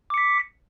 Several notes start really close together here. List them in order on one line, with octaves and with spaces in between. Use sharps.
D6 C#7 B6